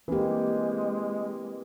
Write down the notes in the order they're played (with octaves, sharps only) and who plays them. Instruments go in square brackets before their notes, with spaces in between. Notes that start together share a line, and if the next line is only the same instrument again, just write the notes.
[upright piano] E3 A#3 [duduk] G#3 [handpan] C4 G4